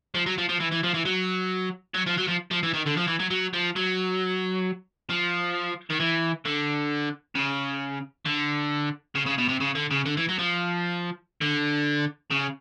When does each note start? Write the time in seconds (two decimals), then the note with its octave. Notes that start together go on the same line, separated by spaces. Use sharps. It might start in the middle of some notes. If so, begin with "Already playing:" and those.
0.15 F3
0.26 F#3
0.38 F3
0.49 F3
0.60 E3
0.71 E3
0.83 F3
0.94 E3
1.05 F#3
1.95 F#3
2.07 F3
2.18 F#3
2.28 F3
2.51 F3
2.63 E3
2.73 D#3
2.86 D3
2.97 F3
3.07 E3
3.19 F#3
3.30 F#3
3.53 F3
3.76 F#3
5.10 F3
5.90 D#3
6.00 E3
6.46 D3
7.35 C#3
8.25 D3
9.15 C#3
9.27 C#3
9.38 B2
9.49 C3
9.61 C#3
9.75 D3
9.91 C#3
10.06 D3
10.17 E3
10.29 F#3
10.39 F3
11.41 D3
12.31 C#3